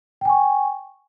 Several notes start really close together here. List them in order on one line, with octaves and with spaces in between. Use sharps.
G5 G#5 C#6